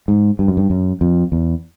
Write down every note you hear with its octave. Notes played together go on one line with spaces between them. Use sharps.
G#2
G2
F#2
G2
F#2
F2
E2